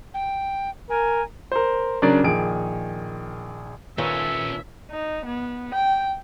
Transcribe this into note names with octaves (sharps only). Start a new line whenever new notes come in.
G5
A#4 G#5
A#4 C5
C#3 F#3 D4 A#4 D5
A#1 D#3 G#4 D7
A#2 D#3 C#4 A4 B4 C#5 E5
D#4
B3
G5